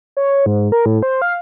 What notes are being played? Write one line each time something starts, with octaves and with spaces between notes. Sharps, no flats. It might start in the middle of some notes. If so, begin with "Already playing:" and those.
C#5
G#2
A#4
A2
C5
F5